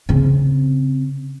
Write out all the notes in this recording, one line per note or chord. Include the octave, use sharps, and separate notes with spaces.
C#3 C4